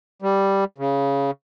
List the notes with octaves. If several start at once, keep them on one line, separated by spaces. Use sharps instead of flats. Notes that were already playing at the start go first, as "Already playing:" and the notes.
G3
C#3